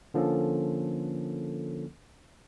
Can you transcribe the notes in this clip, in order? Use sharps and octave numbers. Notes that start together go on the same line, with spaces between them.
D3 F3 A#3 C#4 A4